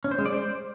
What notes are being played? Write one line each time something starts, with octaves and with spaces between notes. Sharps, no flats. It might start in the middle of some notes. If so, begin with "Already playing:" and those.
C#4
C5
G#3
D5
C5